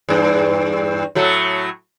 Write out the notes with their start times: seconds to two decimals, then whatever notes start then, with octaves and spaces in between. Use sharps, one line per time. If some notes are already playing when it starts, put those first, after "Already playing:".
0.09 E2 G2
1.15 A2 F#3 A3